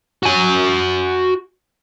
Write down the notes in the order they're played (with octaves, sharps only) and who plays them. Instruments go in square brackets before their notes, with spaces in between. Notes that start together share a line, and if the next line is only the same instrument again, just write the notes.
[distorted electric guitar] F#4 G#5